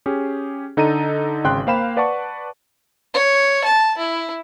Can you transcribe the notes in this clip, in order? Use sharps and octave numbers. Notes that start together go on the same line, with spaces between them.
C#4 G4 G#4
D3 D#4 A4 A#5 D#7
G#1 C#3 G5 C6 F#6
A#3 C5 F5 G5 B5 E7
B4 D5 F#5 A5 C#6
C#5
A5
E4